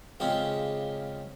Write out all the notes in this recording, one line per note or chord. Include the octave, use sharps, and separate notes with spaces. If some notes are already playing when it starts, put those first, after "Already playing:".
C#3 G#3 C4 C#4 F4 G4